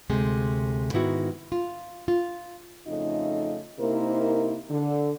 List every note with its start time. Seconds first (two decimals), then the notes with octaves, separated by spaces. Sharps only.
0.09 D2 C3 G#3
0.93 G#2 D#3 B3 E4 F#4
1.52 F4
2.08 F4
2.87 F2 C#3 A3 D#4 F4 D#5
3.79 C3 A#3 D#4 E4 A#4 C5
4.70 D3